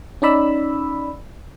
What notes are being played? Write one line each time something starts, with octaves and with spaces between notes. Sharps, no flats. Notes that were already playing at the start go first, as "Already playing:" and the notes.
C#4 D#4 D5 B5 E6